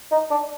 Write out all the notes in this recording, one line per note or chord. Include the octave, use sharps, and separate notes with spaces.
D#4
D4